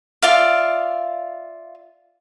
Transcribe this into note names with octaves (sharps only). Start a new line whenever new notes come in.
F4 D5 E5 F5